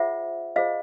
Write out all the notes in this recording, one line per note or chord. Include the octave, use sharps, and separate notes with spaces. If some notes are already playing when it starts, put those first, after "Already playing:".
Already playing: F4 G#4 C5 E5 F#5
F4 G#4 C5 D#5 F5